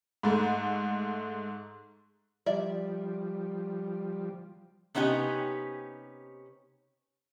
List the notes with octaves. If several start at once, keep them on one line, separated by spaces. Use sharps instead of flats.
G#2 A3
F3 G3 D5 E5
C3 B3 C#4 D#4 G4